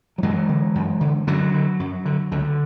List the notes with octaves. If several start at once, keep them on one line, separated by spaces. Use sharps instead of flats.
F#3
F#2 E3 G#3
D3
F#2
D3
F#2 D3 F#3
D3
F#2
D3
C#2 D3